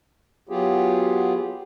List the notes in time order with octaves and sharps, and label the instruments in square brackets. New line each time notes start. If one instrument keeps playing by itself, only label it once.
[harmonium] F#3 B3 F4 G4 G#4